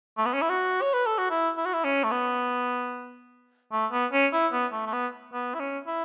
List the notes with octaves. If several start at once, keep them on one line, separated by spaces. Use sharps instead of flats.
A3
B3
C#4
E4
F#4
C#5
B4
A4
F#4
E4
E4
F#4
E4
C#4
A3
B3
A3
B3
C#4
E4
B3
A3
A3
B3
B3
E4
C#4
E4